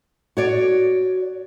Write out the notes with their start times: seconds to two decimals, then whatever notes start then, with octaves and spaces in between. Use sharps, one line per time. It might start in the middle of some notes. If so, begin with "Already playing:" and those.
0.37 F#4 C#5 D5